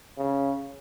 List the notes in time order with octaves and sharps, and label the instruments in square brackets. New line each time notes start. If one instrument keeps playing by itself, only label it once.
[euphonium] C#3